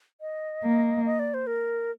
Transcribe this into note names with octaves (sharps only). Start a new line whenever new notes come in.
D#5
A#3
D#5
D5
C5
A#4